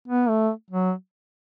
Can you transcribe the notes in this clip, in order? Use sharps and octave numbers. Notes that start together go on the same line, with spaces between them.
B3
A3
F#3